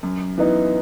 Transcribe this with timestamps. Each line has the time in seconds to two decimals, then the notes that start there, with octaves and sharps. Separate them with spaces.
0.03 F#2
0.38 E3 B3 D#4